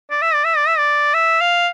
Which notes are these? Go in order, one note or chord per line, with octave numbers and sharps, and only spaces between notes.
D5
E5
D5
E5
D5
E5
D5
E5
F5